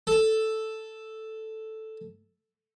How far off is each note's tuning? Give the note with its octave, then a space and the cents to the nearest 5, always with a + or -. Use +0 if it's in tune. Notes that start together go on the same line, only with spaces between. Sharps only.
A4 +0